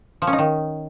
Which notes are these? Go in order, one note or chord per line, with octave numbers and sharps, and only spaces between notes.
F3
C#4
D#4
D#3